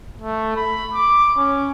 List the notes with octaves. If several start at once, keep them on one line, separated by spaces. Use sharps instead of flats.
A3
B5
D6
C#4